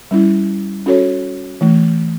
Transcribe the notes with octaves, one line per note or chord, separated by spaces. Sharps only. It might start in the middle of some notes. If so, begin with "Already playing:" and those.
G3 C#4 E4
C#4 F#4 A4 C#5
E3 A3